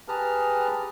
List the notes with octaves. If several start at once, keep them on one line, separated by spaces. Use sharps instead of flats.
G4 G#4 B4 A5 A#5 F6